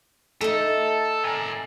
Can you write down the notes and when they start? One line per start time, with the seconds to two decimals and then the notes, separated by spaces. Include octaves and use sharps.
0.41 A3 D#4 A4
1.24 A#4 G#5